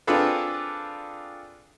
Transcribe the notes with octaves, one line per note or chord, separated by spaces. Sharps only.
C4 D4 F4 G#4 A4 B4